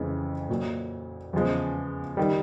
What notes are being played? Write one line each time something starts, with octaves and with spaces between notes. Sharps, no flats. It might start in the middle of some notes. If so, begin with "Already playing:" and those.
Already playing: F2 C#3 E3 G#3
A#2 F#3
E2 C#3 F3 G#3
D#3 G3